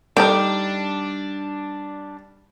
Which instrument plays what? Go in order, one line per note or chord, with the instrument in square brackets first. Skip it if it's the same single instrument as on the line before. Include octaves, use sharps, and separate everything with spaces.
[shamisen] D#3 A3 D#4 [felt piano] G3 [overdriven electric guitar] D4 [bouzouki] D5